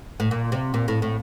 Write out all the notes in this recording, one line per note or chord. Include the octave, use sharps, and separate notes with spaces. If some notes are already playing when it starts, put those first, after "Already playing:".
A2
A#2
C3
A#2
A2
A2